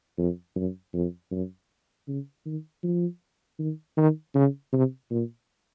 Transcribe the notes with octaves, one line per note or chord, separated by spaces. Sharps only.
F2
F#2
F2
F#2
C#3
D#3
F3
D#3
D#3
C#3
C3
A#2